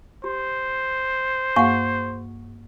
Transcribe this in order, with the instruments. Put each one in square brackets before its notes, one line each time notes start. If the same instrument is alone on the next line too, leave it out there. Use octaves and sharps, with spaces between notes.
[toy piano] G4 [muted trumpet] C5
[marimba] G2 A#3 F5 [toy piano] G#4 F#5 C#6